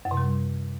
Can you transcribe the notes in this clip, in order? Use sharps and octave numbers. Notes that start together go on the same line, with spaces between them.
F#2
C3
G3